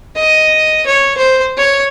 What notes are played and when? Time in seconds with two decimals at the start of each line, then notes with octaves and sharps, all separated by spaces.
0.16 D#5
0.87 C#5
1.17 C5
1.58 C#5